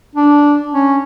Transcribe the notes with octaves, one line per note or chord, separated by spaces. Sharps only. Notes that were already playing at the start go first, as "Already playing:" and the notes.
D4
C#4